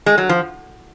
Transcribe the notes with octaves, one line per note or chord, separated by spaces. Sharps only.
G#3
F#3
F3